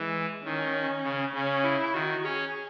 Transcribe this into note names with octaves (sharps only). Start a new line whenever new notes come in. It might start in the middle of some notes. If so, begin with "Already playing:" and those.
Already playing: E3 G#3
D#3 C#4
C#3
C#3 C#4
E4
D#3 F#4
C#4 G#4